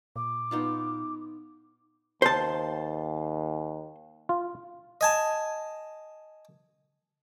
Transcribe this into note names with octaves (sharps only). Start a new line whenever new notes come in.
A#2 D6
B3 D#4 F4
D#2 C5 A5
F4
D#5 G#5 A5